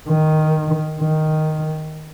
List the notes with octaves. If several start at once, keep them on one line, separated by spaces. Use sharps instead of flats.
D#3
D#3